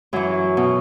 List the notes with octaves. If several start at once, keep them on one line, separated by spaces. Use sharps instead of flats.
F#2 E3 F#3
B2